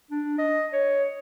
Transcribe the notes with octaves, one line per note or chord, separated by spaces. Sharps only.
D4
D#5
C#5